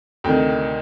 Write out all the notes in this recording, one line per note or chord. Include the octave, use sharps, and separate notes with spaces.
D2 C3 D#3 G5